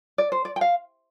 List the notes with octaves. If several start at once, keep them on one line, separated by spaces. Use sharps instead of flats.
D5
C5
D5
G5
F5